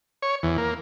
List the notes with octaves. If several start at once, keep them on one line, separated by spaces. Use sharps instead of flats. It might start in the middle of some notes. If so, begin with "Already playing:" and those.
C#5
E2
A#3